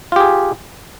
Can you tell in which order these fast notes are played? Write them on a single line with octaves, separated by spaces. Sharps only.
F4 G4 G#4